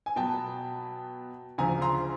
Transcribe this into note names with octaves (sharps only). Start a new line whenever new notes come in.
G#5
B2 F#3 B3 G5 A5
D2 C#3 F3 G#5 A#5
A#5 C6